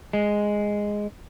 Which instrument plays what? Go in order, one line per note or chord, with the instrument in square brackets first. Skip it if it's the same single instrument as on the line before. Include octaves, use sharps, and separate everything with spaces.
[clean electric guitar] G#3